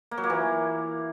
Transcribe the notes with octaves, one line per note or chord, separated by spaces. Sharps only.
A#3
F#3
A#3
E3